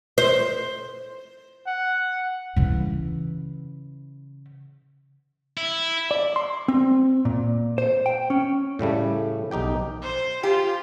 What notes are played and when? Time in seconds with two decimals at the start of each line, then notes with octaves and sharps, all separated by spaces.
0.18 C5
1.67 F#5
2.56 C#3 E3
5.57 E4
6.11 D5
6.36 C6
6.68 C4
7.25 A#2
7.78 C5
8.06 G5
8.30 C#4
8.79 A2 C#3 G3 A3
9.51 B1 D#4 G4 G5
10.02 C5
10.43 F4 G4